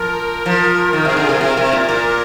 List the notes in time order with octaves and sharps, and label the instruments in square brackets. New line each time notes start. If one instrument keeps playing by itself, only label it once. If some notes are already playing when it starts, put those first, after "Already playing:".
Already playing: [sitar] F3 [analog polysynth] A#4
[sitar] F3
D#3
[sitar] C3 [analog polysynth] G#4
[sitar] D3
[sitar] C3 [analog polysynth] F4
[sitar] C3 [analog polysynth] A#4
[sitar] C3
A#2
[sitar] A#2 [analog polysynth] A#4